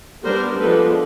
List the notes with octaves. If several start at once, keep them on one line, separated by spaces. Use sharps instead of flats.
G3 B3 D4 A#4 C5
F3 G#3 B3 D4 A4 B4